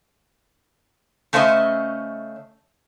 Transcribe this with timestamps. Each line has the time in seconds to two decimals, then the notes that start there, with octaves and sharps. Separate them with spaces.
1.33 C#3 A3 C#4 C5 D#5 E5